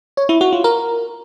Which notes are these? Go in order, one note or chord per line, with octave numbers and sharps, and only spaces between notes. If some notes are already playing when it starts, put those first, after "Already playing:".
C#5
E4
F#4
F4
A#4